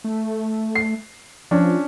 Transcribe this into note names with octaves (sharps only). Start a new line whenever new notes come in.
A3
C7
F3 C#4 D4